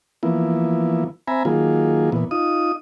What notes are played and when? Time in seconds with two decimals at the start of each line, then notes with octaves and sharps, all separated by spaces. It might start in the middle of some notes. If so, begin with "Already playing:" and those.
0.23 E3 F3 A#3 B3 E4
1.28 C4 E5 G#5 A#5 B5
1.45 D#3 F#3 A#3 F4 G#4
2.12 A#2 E3 B3
2.31 D#4 F4 D#6